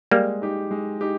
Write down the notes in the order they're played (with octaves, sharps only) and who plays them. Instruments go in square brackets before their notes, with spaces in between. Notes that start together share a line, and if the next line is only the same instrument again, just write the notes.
[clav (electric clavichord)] G3 A#3 [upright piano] G#3
[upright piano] D#4 G4
G#3
D#4 G4